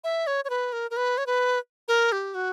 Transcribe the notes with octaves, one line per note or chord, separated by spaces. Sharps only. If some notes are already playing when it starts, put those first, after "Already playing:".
E5
C#5
C#5
B4
A#4
A#4
B4
C#5
B4
A#4
G4
F#4